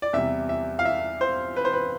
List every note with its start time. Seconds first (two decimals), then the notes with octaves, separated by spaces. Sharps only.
0.02 D5
0.13 E2 C3 G3 E5
0.49 E5
0.79 F5
0.85 E5
1.21 C5
1.56 B4
1.65 C5
1.73 B4